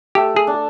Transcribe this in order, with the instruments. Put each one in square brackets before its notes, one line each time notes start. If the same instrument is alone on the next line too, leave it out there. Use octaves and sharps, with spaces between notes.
[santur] A3 [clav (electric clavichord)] G4
[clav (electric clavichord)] G#4
[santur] D4